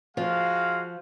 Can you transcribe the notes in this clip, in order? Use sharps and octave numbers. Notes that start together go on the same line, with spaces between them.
F3 G#3 F#4 F5